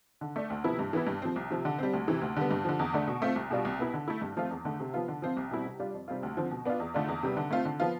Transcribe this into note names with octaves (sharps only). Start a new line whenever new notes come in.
D3
A3 D4
D2
C3 F3 B3 E4
G2
E3 B3 E4
G2
F3 C4
C2
C3 F3
D3
G3 C4
D2
C3 E3
D2
D3 G3 B3
G2
D3 F3
E2
D3 A3 D4
B2
A3 C4 F4
C2
B2 G3 D4 F4
C2
B2 B3 E4
D3
A3 E4
G2
F3 A3 C4 F4
E2
D3 A3
C3
F3 B3 F4
D3
F3 C4 F4
C2
B2 G3 C4 E4
C3
G3 D4 F4
F2
C3 G3 C4 F4
D2
D3 F3 C4
B2
B3 D4 F4
E2
D3 A3 D4 F4
E2
C3 G3 B3
D3
A3 C4 F4
D3
F3 B3 F4